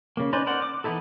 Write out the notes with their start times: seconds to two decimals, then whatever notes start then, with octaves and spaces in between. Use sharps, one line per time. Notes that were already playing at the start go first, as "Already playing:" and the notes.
0.17 C#3 A#3
0.33 C#4 D#4 B4 C5 D5
0.46 A#4 C5 D5 F#5
0.62 D6
0.84 E3 B3 D#4 E4 A4